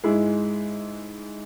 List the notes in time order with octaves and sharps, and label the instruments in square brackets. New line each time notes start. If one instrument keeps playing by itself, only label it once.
[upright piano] G#2 G#3 E4 G#4